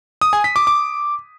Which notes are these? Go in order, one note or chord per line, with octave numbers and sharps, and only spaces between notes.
D#6
G#5
B6
D6
D6